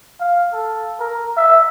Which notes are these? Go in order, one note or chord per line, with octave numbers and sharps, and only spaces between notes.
F5
A4
A#4
E5